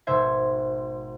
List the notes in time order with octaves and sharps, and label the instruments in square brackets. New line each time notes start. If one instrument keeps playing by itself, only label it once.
[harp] G#1 B2 C5 E5 G#6